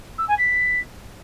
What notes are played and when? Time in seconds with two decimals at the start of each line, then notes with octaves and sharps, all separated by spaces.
0.18 E6
0.28 G#5
0.38 B6